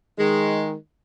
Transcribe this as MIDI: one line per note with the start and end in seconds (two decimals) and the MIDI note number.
0.18 0.73 51
0.18 0.73 56